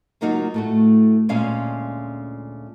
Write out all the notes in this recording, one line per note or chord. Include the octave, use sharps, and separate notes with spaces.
C#3 F#3 A#3 D#4 F4 F#4
A2 A3 F#4
D2 A#2 G#3 C#4 F5 G#5